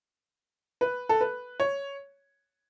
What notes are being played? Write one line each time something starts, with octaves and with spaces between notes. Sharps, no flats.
B4
A4
B4
C#5